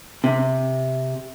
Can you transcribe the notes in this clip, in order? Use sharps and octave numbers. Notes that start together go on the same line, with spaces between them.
C3